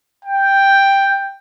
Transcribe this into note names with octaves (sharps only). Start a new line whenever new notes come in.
G5